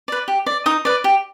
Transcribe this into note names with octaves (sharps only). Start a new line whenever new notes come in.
B4 D5
G4
D5
D#4 D#6
B4 D5
G4